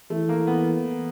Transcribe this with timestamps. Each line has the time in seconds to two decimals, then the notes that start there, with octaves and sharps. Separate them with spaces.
0.10 E3 A3
0.29 A#3
0.47 B3